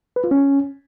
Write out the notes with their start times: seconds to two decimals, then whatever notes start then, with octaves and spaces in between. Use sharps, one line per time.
0.16 B4
0.24 F4
0.31 C#4